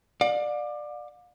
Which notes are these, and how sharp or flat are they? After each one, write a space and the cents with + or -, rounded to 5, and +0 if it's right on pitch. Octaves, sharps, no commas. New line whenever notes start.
D5 +20 F5 +40